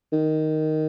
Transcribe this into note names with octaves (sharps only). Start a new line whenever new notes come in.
D#3